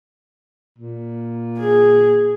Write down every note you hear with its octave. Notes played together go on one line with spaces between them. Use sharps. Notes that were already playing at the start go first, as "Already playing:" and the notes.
A#2
G#4